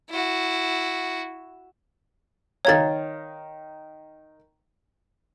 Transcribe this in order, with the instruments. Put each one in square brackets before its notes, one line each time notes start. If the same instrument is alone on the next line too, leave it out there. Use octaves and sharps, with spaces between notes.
[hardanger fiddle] E4 F#4
[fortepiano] D#3 F5 A#5 [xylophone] C#5 G#6 A6